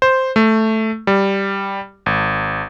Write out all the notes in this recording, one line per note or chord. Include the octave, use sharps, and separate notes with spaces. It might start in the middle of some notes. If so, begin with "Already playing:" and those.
C5
A3
G3
G#1